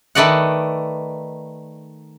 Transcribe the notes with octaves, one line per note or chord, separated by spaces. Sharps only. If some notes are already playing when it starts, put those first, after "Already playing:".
D#3 A3 B4 D5 D#5 F#5